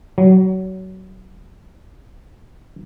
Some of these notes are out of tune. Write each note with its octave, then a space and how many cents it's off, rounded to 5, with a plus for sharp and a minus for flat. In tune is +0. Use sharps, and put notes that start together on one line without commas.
F#3 +25